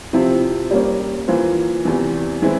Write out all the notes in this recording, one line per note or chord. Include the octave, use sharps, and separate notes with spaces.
C3 F3 C4 E4
G3 A#3 C#4
E3 A#3 F4 C5
E2 C3 E3
E3 G#3 C4 E4